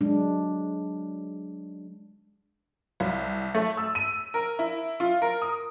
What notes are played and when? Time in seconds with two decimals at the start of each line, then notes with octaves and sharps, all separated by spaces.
0.01 F#3 G#3 D4
3.00 C2
3.55 A3
3.77 E6
3.95 D#7
4.34 A#4
4.59 E4
5.00 F4
5.22 A#4
5.42 D#6